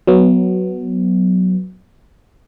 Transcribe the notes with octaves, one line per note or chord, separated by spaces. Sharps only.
F#3 B3